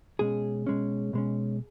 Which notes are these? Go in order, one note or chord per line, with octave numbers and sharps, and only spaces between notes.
B2 G#3 C#4 G#4
B2 G#3 C#4
B2 G#3 C#4